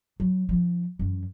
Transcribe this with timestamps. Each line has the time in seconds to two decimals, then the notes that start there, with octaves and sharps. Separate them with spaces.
0.20 F#3
0.49 F3 D#4
0.99 F#2 E3